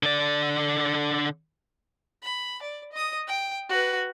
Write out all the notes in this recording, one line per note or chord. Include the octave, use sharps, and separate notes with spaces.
D3 D5
B5
D5
D#5 D#6
G5
F#4 B4